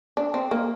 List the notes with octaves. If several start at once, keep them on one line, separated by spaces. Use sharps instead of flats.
D4
C4
A#3